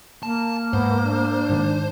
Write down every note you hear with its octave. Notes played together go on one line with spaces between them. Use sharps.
A#3 A5
G#2 B3 C5
D4
G#2 D#3